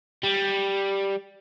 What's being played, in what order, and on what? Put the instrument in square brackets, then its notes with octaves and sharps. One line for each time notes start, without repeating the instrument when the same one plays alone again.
[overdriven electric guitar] G3